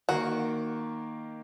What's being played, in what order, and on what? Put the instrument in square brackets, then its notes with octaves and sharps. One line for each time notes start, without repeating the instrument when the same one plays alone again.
[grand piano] D#3 A#3 [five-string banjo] F#4